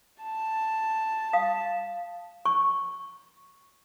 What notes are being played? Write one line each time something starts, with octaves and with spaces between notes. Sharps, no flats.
A5
F5 D#6
C#6